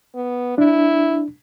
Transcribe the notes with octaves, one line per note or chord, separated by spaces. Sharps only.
B3
D4 E4